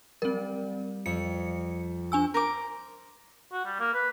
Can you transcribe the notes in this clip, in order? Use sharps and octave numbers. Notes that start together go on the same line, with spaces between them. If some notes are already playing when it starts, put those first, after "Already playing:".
G3 C4 A#4
F2 C#7
D4 G#5 E6
A#4 C5 D6
F#4
G3
A#3
B4